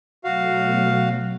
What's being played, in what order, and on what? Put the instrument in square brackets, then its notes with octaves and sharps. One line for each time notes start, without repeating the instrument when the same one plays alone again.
[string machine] B2 F#3 A3 [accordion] F#4 F5